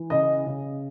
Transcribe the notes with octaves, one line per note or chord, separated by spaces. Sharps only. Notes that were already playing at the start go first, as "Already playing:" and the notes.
Already playing: E3
C#3 D#5
C#3